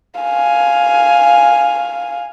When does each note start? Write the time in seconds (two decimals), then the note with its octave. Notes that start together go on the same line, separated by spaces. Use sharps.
0.21 F5 G#5